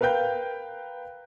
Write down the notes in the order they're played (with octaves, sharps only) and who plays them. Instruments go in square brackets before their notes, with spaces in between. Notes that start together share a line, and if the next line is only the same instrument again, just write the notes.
[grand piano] A#4 B4 F5 G5 G6